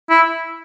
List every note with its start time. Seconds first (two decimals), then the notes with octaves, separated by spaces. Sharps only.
0.10 E4